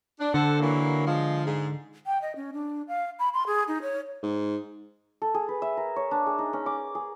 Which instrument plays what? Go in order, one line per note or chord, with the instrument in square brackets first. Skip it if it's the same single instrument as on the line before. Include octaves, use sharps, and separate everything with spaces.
[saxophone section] D4
[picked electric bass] D3 [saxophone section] A4 C5 F#5
[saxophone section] E3 F#3 A#3
F3 G#3
G#2 G#4
[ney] G5
D#5
C#4
D4
F5
B5
C6
G#4
D#4
C#5
[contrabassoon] G#2
[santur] A4
G#4
B4
E5
A#4
C#5
D4
G#4
D#4
C#4
D6
G#4